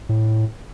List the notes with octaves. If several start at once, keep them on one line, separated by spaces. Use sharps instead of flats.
A2